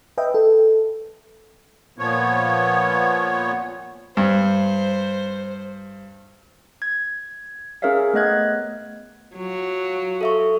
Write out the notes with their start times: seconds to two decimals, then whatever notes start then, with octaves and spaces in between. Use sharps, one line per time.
0.18 B4 D#5 E5 G5
0.34 A4
1.98 A#2 F3 B3 C#5
4.17 G2 C5
6.82 G#6
7.82 C#4 G#4 A#4 C#5 E5 F5
8.14 A3 B3 D#5 F#6 G#6
9.36 F#3 F4 F#4
10.21 A4 E5 C#6